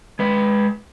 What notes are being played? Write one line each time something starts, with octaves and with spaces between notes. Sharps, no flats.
G#3 B4